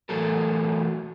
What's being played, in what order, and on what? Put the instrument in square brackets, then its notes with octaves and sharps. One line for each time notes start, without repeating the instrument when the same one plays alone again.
[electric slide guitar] E3 F#3 A3 F#4 A4 A#4